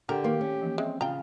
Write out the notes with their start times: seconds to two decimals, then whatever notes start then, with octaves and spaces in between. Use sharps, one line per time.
0.09 D3 G4 A#4 D5 F#5 G5
0.24 D#3 A#3 D#4 B4
0.41 C#4
0.61 E3 F3 A#3
0.78 G#3 C4 E5
1.01 C#3 F4 G5 A#5